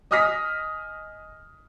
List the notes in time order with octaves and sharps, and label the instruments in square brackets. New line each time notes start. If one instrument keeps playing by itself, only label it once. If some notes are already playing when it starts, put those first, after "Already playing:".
[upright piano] D#5 G#5 D#6 F6 A#6 B6